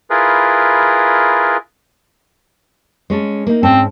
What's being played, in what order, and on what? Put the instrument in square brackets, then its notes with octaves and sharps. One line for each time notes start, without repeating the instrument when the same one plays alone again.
[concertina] E4 F4 G#4 A#4 B4
[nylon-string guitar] G#3 C#4 A4
A#3 D#4
[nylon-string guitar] G#2 C#4 A5 [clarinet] C4